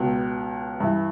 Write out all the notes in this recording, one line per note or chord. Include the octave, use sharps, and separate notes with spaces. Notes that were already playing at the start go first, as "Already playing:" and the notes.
Already playing: C#2 B2
G2 E3